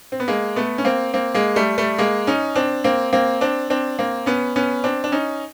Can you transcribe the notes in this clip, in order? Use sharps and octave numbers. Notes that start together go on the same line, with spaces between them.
C4
B3
G#3 A#3
A3 B3
C#4
A#3 C4
A#3 C4
G#3 A#3
G3 A3
G3 A3
G#3 A#3
C#4 D#4
C4 D4
A#3 C4
A#3 C4
C4 D4
C4 D4
A#3 C4
B3 C#4
B3 C#4
C4 D4
D4
C#4 D#4